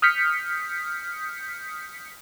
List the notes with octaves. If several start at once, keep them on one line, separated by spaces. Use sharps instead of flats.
D#6 F6 G6 B6 C#7